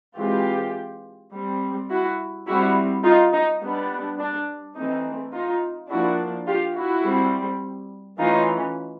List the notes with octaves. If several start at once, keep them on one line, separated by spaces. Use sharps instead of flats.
E3 G#3 C4 F4 G4
G3 C4
E4 F#4
G3 C4 E4 F#4
D#4 F4
D#4
G3 B3 D4
D4
E3 A3 C4 D#4
D#4 F4
F3 A#3 D4 E4 F#4
F4 G4
E4 F#4
G3 C4
E3 A3 C#4 D#4 F4